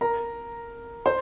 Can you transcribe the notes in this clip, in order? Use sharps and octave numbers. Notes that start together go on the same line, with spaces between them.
A#4 A#5
C5 C6